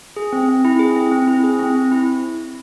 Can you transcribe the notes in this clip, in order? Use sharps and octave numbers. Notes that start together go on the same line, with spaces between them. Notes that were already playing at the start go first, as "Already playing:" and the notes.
G#4
C4
C4
E4
G#4
C4
C4
E4
G#4
C4
C4
E4